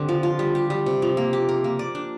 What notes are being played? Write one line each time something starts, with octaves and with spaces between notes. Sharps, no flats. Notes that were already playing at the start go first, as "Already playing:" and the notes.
Already playing: D3 C4 G4
F3
F4
G3
G4
G3
C3
F3
A#3
G4
A#4
A#3
D5
D4